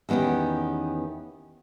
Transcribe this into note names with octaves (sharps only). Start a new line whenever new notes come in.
E2 D#3 B3 C#4 G4